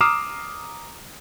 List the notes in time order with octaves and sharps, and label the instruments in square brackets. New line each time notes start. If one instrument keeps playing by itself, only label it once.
[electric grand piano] A#5 D6 D#6 F6 C7 E7